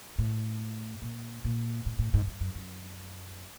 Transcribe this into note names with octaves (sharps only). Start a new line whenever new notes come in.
A2
A#2
A#2
A2
A2
G#2
G2
F#2
F#2